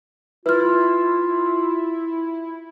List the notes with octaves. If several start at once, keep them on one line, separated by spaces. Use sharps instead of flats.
E4 F4 B4 F6